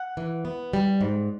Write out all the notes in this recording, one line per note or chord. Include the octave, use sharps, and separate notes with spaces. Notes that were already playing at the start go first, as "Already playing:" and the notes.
Already playing: F#5
E3
B3
G3
G#2